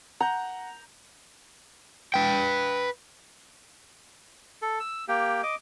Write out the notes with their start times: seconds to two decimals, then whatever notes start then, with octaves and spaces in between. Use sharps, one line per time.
0.20 F#5 A#5 G6
2.14 B4 G5
4.62 A4
4.80 E6
5.08 A#3 G4
5.43 D#5 D6